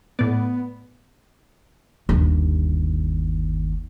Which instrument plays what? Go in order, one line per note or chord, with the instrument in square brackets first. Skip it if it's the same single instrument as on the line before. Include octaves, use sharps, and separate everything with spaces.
[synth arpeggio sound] A2 D5 [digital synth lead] B3
[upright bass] G1 D#2